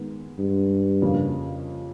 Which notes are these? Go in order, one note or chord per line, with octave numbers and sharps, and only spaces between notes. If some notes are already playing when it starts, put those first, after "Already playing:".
Already playing: D#3 G#3 B3
G2
F2 C#3 F3 A#3